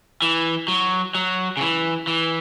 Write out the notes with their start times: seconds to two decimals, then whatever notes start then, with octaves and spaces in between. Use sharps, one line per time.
0.22 E3
0.68 F#3
1.15 F#3
1.57 C#3
1.61 E3
2.07 E3